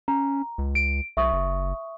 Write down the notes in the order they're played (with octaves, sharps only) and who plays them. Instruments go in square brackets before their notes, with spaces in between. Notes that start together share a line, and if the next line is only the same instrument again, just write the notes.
[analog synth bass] C#4 [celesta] A#5
[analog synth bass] C#2
[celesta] D7
[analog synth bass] B1 [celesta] E5 C#6 D#6
[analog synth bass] F#1